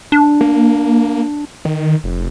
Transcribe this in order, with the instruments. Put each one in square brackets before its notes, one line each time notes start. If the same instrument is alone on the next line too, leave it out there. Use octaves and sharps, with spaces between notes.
[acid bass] D4
[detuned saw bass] A#3
D#3
F1